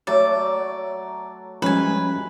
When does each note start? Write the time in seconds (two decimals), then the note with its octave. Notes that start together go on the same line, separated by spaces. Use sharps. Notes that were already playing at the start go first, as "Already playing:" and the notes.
0.07 F#3 A3 D5
1.62 F3 G3 G#3 C#4 B4 G#5